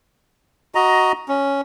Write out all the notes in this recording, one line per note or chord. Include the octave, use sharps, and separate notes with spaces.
F#4 D#5 A#5
C#4